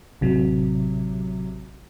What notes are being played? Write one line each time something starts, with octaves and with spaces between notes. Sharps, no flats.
A1 C3 F#3